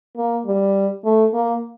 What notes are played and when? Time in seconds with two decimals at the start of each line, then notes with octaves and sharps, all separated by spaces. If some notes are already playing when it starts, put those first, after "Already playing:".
0.17 A#3
0.46 G3
1.04 A3
1.33 A#3